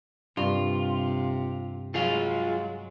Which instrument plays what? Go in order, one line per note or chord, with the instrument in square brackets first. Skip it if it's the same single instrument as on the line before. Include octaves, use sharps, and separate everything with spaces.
[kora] G2 [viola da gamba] C3 [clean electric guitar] F4
[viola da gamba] F#3 G#3 [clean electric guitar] F4 G#4 F5